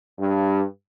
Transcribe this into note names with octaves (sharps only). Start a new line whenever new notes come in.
G2